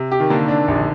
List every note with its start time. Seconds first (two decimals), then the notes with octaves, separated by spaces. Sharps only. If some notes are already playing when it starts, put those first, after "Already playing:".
Already playing: C3
0.11 G4
0.20 D#3
0.30 D3 A#3
0.48 D4
0.67 A#1 C3
0.75 D3